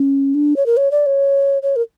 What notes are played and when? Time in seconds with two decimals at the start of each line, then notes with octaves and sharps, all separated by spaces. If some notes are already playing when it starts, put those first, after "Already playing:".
Already playing: C#4
0.34 D4
0.56 C#5
0.66 A#4
0.77 C#5
0.91 D5
1.06 C#5
1.63 C#5
1.76 A#4